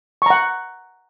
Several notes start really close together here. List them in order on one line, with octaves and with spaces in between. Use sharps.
C#6 A#5 F#5